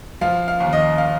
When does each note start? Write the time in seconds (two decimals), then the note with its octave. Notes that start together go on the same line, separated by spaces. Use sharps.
0.21 F3 F5
0.48 F5
0.60 D#2
0.73 D#5
0.98 F5